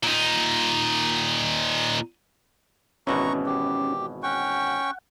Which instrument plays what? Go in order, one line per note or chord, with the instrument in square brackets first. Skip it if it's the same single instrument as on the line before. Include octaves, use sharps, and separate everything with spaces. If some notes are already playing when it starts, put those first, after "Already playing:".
[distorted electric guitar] A#2 D#4
[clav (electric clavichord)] G#1 B2 E3 [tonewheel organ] C#4 [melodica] A#5 C#6
[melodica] G4
[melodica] C#4 G5 C#6 [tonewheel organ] F#5